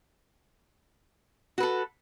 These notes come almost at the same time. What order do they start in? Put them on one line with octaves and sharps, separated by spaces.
F#4 B4 A4